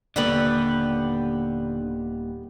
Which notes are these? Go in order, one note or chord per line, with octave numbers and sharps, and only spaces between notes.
D#1 D3 G3 A#3 B3 G4 B4